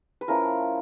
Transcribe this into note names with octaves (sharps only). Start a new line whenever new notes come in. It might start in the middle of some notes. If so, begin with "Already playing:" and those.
B4
F3 A3 C#4 E4 A#4